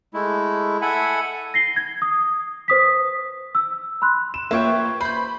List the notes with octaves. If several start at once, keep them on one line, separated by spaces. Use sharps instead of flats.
G#3 A3 E4
A4 E5 F#5 G#5 B5
A#6 C7 G7
G#6
D#6
B4 C5 D#6 B6
E6
B5 C6 F#6
E7
A#3 F4 B4 C#5 E5 G5
C5 B5 G6